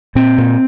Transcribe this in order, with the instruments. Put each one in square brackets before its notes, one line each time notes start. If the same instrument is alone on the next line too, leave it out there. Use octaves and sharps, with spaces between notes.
[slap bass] A#2 C4
A#2